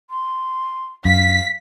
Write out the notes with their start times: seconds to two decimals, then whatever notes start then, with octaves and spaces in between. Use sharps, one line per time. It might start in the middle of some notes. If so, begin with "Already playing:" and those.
0.10 C6
1.05 F#2 F5 B6